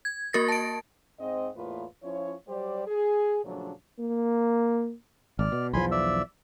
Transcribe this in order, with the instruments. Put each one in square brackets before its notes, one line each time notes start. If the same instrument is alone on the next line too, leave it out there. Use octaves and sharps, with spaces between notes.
[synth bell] G#6
A#3 F#4 A#4 A6 A#6
A5 D7
[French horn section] G#2 C4 D#5
E2 A2 A#3 F4 B4
F3 C#4 E4 F4 C#5
F#3 G3 G4 C5 D5
G#4
A#2 C#3 F3 F#3 A3 D4
[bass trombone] A#3
[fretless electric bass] G#1 [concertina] D5 F6
[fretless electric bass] B2
[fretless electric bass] B1 E2 F3 [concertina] G#5 B5 C6
[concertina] D5 E5 E6